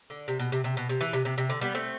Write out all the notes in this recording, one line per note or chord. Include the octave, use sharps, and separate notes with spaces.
D3
C3
B2
C3
C3
B2
C3
E3
C3
C3
C3
D3
G3 B3
A3 C4